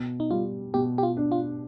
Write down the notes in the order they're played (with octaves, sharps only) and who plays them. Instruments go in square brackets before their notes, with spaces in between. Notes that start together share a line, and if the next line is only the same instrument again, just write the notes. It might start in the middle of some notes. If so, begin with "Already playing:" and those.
Already playing: [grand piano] B2
[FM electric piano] D#4
[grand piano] G3 [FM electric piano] F4
[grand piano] B2 [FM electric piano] G4
[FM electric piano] G4
F4
[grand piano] D4
[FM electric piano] F4